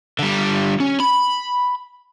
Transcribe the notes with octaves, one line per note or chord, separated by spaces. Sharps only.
D3 G3
C#4
B5